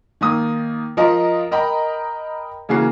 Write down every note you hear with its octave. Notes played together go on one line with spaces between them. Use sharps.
D#3 A#3 D#6
F3 F4 A#4 D#5 A#5
A#4 D#5 G5 A#5 B5
C#3 E3 A#3 F#4 C7